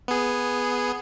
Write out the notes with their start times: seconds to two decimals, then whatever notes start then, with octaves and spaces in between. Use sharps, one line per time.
0.08 B3 G#4